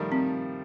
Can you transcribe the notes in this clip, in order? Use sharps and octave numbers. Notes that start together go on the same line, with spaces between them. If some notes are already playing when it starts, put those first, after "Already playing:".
Already playing: D#3 F3 G3 A3
C4